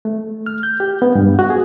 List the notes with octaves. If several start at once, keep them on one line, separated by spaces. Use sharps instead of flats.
A3
F6
G6
G4
B3
G2
F#4
G#4